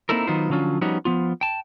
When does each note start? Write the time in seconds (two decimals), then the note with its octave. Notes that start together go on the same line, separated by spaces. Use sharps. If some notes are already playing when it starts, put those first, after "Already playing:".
0.09 A#3 C4 D#4 E4 A4 A#4
0.27 D#3 F#3 B3 D#4 F4 C5
0.50 D3 F3 F#3 C#4 F4
0.81 F3 G3 B3 C#4 D#4 F#4
1.05 F3 B3 F4
1.41 G5 A5